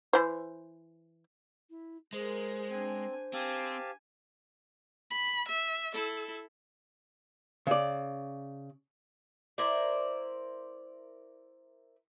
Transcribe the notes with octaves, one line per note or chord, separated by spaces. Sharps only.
E3 C5
E4
G#3 G#4 A#4 C5
C4 D4 G#5
C4 G4 F5 G#5 A5
B5
E5
E4 A4
C#3 D5
E4 A#4 C5 D5